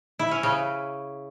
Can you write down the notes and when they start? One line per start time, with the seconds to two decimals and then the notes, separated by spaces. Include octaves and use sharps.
0.19 E4
0.31 C#4
0.43 C#3